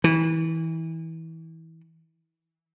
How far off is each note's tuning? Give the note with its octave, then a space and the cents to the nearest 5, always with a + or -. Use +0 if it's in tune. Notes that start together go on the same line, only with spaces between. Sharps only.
E3 -25